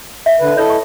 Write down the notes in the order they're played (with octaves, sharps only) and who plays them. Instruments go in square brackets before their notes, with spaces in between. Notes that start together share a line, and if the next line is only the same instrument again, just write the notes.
[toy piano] E5
[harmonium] D3 B4
[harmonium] E4 A4 D#5 [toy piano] B4 C#5
[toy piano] C#6